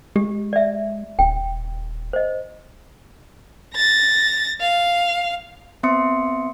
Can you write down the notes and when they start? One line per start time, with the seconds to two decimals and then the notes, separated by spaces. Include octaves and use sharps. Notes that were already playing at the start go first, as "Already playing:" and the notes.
0.16 G#3 G4
0.53 D5 E5
1.19 D#1 G5
2.13 C5 D#5
3.74 A6 A#6
4.61 F5
5.83 B3 C4 E5 C6 D#6 C#7